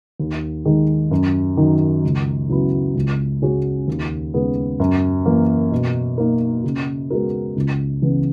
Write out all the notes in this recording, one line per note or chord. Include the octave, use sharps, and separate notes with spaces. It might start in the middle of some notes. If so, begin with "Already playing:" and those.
D#2
D#3 G#3
F#2
D#3 F#3
C#2
C#3 F#3 B3 E4
C#2
C#3 G#3 C#4 F#4
D#2
C#3 G#3 B3
F#2
E3 A#3
B2
A#3 D#4 A#4
C#3
G#3 B3 F#4 A#4
C#2
C#3 E3 B3